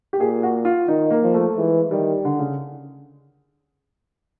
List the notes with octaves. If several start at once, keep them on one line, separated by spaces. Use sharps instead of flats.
G4
A#2 G#4
F#4
F4
D#3 D#4
A#3
F3
A3
E3 G#3
D#3 G3
D3
C#3